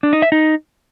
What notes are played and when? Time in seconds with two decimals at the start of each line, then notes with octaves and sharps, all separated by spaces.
0.03 D4
0.13 D#4
0.22 E5
0.32 D#4